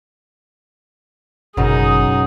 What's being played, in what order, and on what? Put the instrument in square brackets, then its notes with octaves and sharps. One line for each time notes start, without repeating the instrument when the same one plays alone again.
[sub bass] G1 [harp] F#2 B2 [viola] D#4 G#4